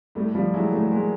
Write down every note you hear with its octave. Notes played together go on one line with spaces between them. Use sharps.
A2 G3 A3
A2 F3 G3
F#3 G#3 E4
A2 G3 A3
A2 G#3 A#3